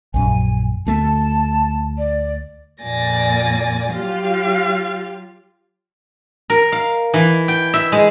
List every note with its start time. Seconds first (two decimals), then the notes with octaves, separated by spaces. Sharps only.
0.14 A#1 F#2 G#5
0.87 D2 A3 A5
1.98 D5
2.82 F2 A#2 D5 G#5 A6 A#6
3.93 F#3 F4 G4 F5
6.50 A#4
6.72 F5
7.14 E3
7.48 G5
7.74 E5
7.92 G#3